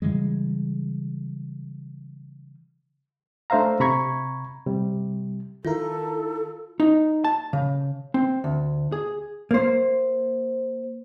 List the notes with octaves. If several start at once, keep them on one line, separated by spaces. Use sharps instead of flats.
C#3 E3 G3 G#3
A3 D4 C5 E5 F5 A#5
C3 A#5 B5 C#6 G#6
C3 G3
D#3 E4 F4 A4 A#4
D#4
A5
C#3
C4
D2
G#4
A#3 C5